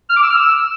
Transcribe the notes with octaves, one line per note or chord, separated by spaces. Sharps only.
F6
D6
E6
F6
E6